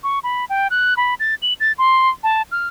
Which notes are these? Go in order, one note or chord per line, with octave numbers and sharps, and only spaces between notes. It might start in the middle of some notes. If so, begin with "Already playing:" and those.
C#6
B5
G5
F#6
B5
A6
F#7
A6
C6
A5
F6